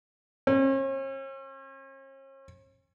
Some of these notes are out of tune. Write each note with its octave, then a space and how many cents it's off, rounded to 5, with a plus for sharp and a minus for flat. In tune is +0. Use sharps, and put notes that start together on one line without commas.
C#4 -45